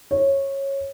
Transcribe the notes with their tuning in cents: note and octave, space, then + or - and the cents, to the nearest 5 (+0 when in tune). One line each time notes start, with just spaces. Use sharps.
C#5 -15